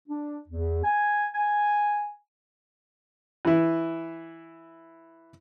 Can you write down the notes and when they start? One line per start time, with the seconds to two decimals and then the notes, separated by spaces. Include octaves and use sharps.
0.08 D4
0.49 E2
0.84 G#5
1.33 G#5
3.45 E3 E4